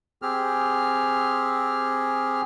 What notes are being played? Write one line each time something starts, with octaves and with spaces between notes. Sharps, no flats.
C4 G4 G#4 F6